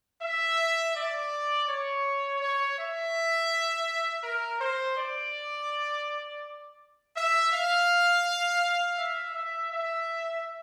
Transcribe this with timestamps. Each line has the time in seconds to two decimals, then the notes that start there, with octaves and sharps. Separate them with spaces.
0.22 E5
0.95 D5
1.68 C#5
2.41 C#5
2.78 E5
4.23 A#4
4.60 C5
4.97 D5
7.15 E5
7.52 F5
8.98 E5
9.35 E5
9.71 E5